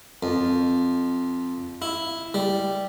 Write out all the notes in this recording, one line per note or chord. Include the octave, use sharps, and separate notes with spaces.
F2
E4
G3